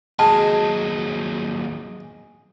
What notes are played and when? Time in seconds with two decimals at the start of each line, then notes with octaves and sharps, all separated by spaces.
0.19 D#2 F#3 G#3 A5